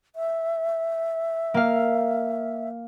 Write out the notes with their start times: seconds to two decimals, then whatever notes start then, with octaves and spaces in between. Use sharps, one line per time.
0.16 E5
1.54 A#3 F5